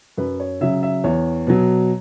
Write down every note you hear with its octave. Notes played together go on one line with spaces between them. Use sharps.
F#2 B4
C#5
C#3 F#3 E5
E5
E2 C#5
B2 F#3